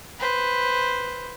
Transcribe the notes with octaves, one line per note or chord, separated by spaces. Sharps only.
B4 C5